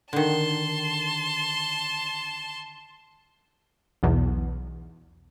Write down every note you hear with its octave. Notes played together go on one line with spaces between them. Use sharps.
D3 D#3 A5 C6
B1 E2